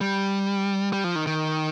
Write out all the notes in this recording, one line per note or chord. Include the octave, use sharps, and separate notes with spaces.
G3
G3
F3
D#3
D#3